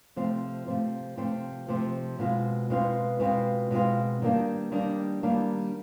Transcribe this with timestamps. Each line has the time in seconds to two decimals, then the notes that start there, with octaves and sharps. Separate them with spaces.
0.16 C3 F3 A3 C4
0.67 C3 F3 A3 C4
1.17 C3 F3 A3 C4
1.68 C3 F3 A3 C4
2.19 B2 G#3 C4 F4
2.70 B2 G#3 C4 F4
3.20 B2 G#3 C4 F4
3.71 B2 G#3 C4 F4
4.22 D#3 G3 A#3 D4
4.72 D#3 G3 A#3 D4
5.23 D#3 G3 A#3 D4